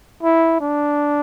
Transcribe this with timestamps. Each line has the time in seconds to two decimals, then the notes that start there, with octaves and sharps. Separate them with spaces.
0.23 E4
0.61 D4